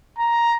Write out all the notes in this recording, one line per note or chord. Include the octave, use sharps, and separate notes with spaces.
A#5